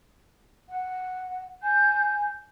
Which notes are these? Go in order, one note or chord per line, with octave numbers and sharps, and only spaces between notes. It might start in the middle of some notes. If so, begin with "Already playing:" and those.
F#5
G#5 G6